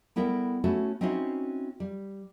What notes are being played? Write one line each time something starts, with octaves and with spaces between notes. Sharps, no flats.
G3 B3 E4 A4 A#4 G5
A3 C#4 E4 F#4 A4
C4 C#4 D#4 E4 F#4 C5
G3